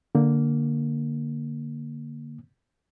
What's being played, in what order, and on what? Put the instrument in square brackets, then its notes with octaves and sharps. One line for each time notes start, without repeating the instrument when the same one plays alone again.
[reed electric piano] D3 A#3